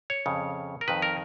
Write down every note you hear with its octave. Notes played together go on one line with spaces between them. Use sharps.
C#5
F2 C#3
A#4
F2 D#3 B4
A#4